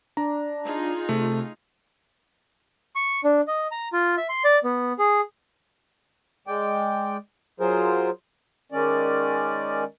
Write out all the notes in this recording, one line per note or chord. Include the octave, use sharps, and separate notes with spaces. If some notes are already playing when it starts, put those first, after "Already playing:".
D4 A#5
D#4 F4 G#4
C3 A3
C#6
D4
D#5
A#5
F4
E5
C6
D5
B3
G#4
G#3 D5 G5
F#3 F4 G#4 A#4 C5
D#3 G#3 C#4 D5